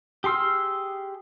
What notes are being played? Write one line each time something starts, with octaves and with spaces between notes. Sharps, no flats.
G4 G#4 C6 E6 F6